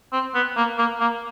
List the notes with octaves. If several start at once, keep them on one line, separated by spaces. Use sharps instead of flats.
C4
B3
A#3
A#3
A#3